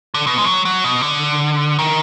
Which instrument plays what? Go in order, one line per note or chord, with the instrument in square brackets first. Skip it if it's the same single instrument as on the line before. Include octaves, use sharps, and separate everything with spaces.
[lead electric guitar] D3
B2
G#3
F#3
F#3
B2
D3
D#3